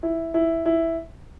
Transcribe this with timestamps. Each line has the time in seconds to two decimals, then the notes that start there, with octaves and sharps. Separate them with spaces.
0.03 E4
0.34 E4
0.66 E4